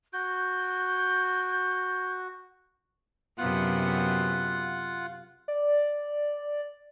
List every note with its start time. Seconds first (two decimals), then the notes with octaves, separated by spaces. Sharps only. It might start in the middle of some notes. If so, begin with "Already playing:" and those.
0.13 F#4 G6
3.38 F#2 C3 B3 F4 F#5
5.48 D5